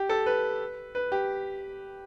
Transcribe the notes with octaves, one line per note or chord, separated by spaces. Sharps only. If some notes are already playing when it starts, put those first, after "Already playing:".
Already playing: G4
A4
B4
B4
G4